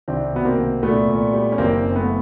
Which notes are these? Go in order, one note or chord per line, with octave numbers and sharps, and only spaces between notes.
C2 C4 D4
B2 B3
A#3 C4
C2
A#2 A3 B3
A#2
G3
C#4
F#1 A#3 C4
F#2
C4
A3 B3